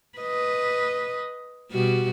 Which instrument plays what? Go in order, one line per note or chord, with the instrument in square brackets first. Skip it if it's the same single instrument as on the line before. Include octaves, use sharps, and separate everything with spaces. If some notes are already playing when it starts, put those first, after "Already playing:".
[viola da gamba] B4 D#5
B2 G3 F#4